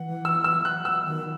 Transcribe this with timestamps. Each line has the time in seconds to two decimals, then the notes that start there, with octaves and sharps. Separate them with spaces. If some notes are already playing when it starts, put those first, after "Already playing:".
Already playing: E3 F#5
0.25 E6
0.44 E6
0.65 F#6
0.85 E6
1.05 D#3